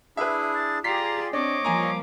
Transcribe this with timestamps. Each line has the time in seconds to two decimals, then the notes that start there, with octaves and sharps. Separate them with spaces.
0.17 D4 E4 G#4 B4 E5
0.55 A6
0.84 F4 G4 G#4 D5 A#5 B6 C7
1.33 C4 D4 C#5 D#5 D6
1.65 F3 G3 A#3 G#5 A#5